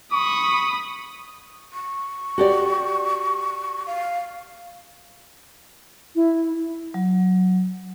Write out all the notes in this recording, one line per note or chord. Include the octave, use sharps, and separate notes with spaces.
B5 C#6 D#6
C#6
F#4 G4 D5
F5
E4
F#3